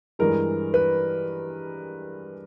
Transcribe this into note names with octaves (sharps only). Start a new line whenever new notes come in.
G2 E3 G#3 A#4
B4